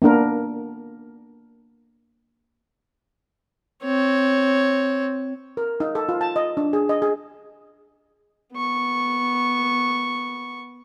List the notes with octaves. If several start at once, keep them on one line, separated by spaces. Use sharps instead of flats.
A#3 B3 D4 A#4
C4 C#5
A#4
D#4
A4
F4
A5
D#5
D4
G#4
D#5
G#4
B3 C#6